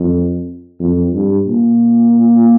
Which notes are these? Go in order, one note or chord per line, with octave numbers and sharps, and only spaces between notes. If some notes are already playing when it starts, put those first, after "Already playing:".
Already playing: F2
F2
G2
A#2